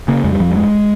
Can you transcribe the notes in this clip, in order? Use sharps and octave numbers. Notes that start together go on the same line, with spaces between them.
C#3 A#3
F2 G#3
G3
F2 F3
G3
G2 G#3